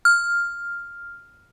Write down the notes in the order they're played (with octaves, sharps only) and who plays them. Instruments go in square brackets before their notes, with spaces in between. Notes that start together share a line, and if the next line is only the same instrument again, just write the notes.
[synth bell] F6